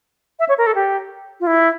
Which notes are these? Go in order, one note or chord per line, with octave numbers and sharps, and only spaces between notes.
E5
C#5
A#4
A4
G4
F4
E4